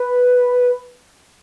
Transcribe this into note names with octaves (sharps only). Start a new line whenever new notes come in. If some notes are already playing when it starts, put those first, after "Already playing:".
Already playing: B4